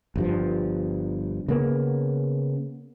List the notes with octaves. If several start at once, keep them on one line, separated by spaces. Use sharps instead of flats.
G1 G2 F3
C#3 A#3 B3